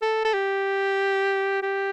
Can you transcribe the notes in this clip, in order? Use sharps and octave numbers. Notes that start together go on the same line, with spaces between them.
A4
A4
G4
G4